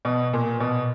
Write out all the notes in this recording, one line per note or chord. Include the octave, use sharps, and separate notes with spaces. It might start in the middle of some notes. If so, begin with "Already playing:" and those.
B2
A#2
B2